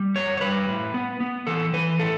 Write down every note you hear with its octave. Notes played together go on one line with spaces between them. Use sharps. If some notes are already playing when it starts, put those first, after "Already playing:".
Already playing: G3
F#2 C#5
C#5
G3 B4
A2
B3
B3
E3 A4
E3 B4
A2 A4